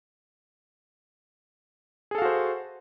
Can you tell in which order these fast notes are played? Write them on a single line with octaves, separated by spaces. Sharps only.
G#4 A4 F5 F#4 C5